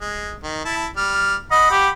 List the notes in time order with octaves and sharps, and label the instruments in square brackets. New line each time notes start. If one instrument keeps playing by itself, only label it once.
[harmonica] G#3
D#3
E4 A5
G3 F6
[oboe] D#5 [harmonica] F#5 B5
[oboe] G4